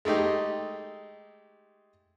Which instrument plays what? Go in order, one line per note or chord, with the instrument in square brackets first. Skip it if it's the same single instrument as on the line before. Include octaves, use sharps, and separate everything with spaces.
[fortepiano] G#3 A3 D#4 G4